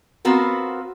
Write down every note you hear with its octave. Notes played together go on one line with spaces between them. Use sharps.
B3 C4 F4 F#4 A#4